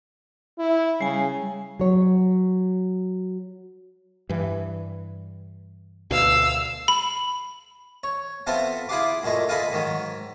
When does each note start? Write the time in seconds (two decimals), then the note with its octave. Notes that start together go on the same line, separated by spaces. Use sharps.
0.59 E4
1.01 C#3 G3 G#5
1.79 F#3 C#5
4.29 G2 E3
6.11 D2 B2 F5 E6
6.88 B5
8.04 C#5
8.47 B3 C4 F4 A4 C5 E5
8.89 E4 F4 G#4 F#5 C6 D6
9.24 F#2 A#2 G#3 A3
9.49 F4 G#4 A4 B4 D#5 E5
9.72 G#2 D#3 F#3